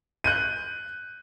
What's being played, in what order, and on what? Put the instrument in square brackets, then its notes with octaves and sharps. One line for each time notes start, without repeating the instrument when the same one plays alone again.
[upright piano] F#6 G6 D#7